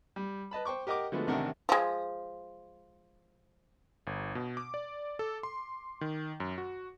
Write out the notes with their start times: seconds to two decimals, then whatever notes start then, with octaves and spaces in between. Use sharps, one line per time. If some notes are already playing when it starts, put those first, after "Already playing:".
0.16 G3
0.51 B4 D#5 A5 B5
0.65 C5 G5 C#6 D6
0.87 G4 A#4 D#5 F#5 D6
1.12 D3 F3 G#3 A3 B3 F#4
1.27 A1 C3 D#3 D4 A#4 F#5
1.69 F3 G#3
4.07 G1
4.35 B2
4.57 D6
4.74 D5
5.19 A4
5.43 C6
6.01 D#3
6.40 F#2
6.58 F#4